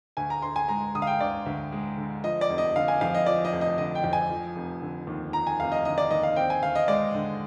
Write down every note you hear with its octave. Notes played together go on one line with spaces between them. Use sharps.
D2 G#5
A#5
D2 C6
G#5
G#3 A#5
D3 D#6
F5
G5
D2 D5
D2
G#3
D3
F3 D#5
D5
F1
D#5
D3 F5
G#5
F2 F5
D#5
F3 D5
D#5
F1
D#5
D3 D#5
G5
F2
G#5
F3
F1
D3
D#2
F3 A#5
G#5
F1 F5
D#5
D3 D#5
D5
D#2 D#5
F5
C4 G5
G#5
D2 F5
D#5
G#3 D5
D3